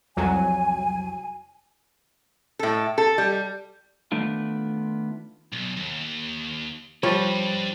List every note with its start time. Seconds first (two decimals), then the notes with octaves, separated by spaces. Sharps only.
0.17 C2 F2 F#3 G#5
2.59 A2 A4
2.98 A4
3.18 G3
4.12 D#3 A3 B3 D4 F4
5.52 B1
5.77 D#2
7.03 F3 G3 D4 B4 C#5